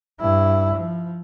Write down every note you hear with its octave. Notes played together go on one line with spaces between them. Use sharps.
G2 E4
F3